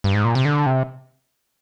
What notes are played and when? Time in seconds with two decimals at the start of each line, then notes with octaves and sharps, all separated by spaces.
0.04 G2
0.14 G#2
0.25 A#2
0.35 C3
0.45 D3
0.66 C3